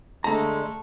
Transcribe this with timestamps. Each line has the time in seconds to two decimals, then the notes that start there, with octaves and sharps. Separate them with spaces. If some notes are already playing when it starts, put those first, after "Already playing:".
0.24 D3 G#3 A3 A5 A#5